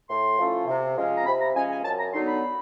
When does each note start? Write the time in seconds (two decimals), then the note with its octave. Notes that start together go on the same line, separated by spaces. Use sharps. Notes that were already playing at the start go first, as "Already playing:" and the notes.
0.09 A2 C6
0.38 F3 A3 C#4 E4
0.67 C3
0.97 F3 G#3 C#4
1.16 A#5
1.26 C3 B5
1.40 A#5
1.55 F3 G#3 C#4 G#5
1.69 G#5
1.84 F#2 A5
1.99 A#5
2.13 D3 F#3 B3 D#4 C6
2.28 B5